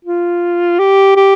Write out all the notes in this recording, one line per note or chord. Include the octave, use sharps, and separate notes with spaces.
F4
G4
G4